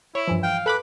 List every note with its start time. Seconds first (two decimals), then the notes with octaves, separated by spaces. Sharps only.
0.15 E4 C#5
0.27 G2 E3 F3
0.43 F5 G5
0.66 A4 B4 B5 D6